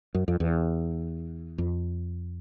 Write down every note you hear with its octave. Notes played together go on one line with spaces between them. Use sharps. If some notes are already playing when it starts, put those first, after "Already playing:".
F#2
F2
E2
F2